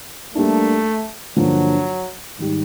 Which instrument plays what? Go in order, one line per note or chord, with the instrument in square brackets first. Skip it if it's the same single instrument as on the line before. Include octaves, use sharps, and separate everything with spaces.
[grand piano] G3 A#3 D4 [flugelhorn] A3
[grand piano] G2 D3 F3 A#3 [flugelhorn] F#3
[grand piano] G#2 D#3 G3